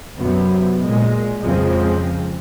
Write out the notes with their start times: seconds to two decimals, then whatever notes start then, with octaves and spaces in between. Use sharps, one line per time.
0.18 F#2 C3 F#3 B3
0.86 A#2 G#3
1.42 F2 C#3 F3 G#3 C4